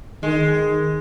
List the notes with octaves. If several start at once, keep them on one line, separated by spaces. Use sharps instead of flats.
D#3 G#3